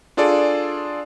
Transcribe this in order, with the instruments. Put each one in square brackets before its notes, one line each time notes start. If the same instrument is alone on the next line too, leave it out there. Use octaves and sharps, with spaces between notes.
[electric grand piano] D4 F4 G#4 A4 D5